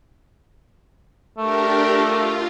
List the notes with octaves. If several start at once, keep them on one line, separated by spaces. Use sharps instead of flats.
A3 D4 G4 A#4
F4